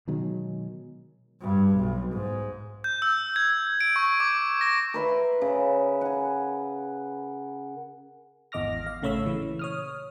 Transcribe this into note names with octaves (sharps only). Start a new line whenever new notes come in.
B2 D#3 F#3 G#3
G2
B1
G#2
G6
E6
G#6
D7
C#6
D6
A#6
A#4 B4 E5 C6
C#3
F#5 G#5
G#1 E2 D#5 D6 F6 A#6
F5
A1 C#3 A3 C#5 B5 E6
A#2 C#3 E3
C#5 D#6 F6